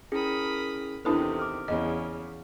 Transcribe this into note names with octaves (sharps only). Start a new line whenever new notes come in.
C#4 E4 G#4 A#4 B5 D#6
E2 C3 D#3 D4 E4 A4 B4 D#6
D6 F6
E2 C#3 D#5